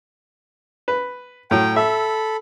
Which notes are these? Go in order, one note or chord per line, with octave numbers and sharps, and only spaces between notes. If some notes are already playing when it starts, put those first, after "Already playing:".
B4
A2 F#3 G5
A4 E5 B5